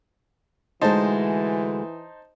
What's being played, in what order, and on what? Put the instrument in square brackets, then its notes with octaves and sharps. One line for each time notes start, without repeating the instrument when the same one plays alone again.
[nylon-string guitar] D2 G#3 [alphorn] E3 [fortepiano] D#4 C5 A5